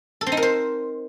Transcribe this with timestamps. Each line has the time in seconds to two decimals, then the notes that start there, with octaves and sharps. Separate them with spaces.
0.21 A4
0.26 C4
0.32 D#4
0.37 A#4
0.43 C5